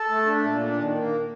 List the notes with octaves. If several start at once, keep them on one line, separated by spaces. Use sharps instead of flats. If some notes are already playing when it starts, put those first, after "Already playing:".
Already playing: A4
A3
D4
A#2
D4
D#3
A#3